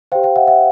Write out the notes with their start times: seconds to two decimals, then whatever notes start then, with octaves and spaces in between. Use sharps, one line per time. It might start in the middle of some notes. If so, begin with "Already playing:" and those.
0.12 G4 C5 F5 G5
0.23 F5 G5
0.36 E5 F#5
0.47 E5 F#5